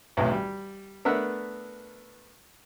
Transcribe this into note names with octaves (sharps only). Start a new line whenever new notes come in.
B1 E2 A2
G3
A3 B3 D4 A#4 E5 F#5